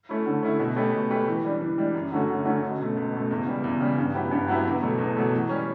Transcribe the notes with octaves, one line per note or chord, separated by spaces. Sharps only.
A3 C#4 E4
D3
A3 C#4 E4
B2
A3 C#4 G4 B4
B2
A3 C#4 G4 B4
E3
G3 D4
E3
G3 D4
F#2
D3 A3 C#4 F#4
F#2
D3 A3 C#4 F#4
C#2
B2 A3
C#2
B2 A3
E2
C#3 G3
E2
C#3 G3
G2
F#3 B3 E4 G4
G2
F#3 B3 E4 G4
E2
B2 F#3 A3
E2
B2 F#3 A3
E3
G3 C#4